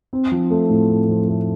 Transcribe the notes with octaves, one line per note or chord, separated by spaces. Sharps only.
C4
F3
A3
A2
C4
F3
A3